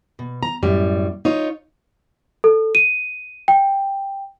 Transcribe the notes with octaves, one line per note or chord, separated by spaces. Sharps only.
B2
A#5
F#2 A2 G3
D#4 F4 C#5
A4
D#7
G5